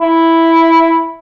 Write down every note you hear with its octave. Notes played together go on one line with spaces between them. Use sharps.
E4